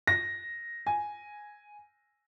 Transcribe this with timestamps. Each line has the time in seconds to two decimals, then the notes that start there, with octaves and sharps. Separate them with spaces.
0.07 A#6
0.87 G#5